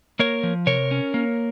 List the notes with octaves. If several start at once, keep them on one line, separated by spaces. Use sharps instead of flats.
A#3 A#4 C#5
F3
C3 A#4 C#5
C#4
A#3